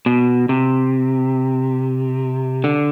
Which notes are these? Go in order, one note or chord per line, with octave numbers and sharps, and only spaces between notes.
B2
C3
D3